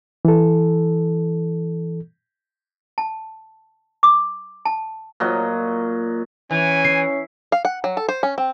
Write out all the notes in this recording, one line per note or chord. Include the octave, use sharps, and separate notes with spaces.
E3 A4
A5
D6
A5
A#2 F#3 D#5
E3 C#4 G#5
C7
F5
F#5
F#3
A4
C5
C#4
C4